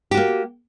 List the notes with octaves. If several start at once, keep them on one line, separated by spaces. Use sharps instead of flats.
A#3 F#4 G4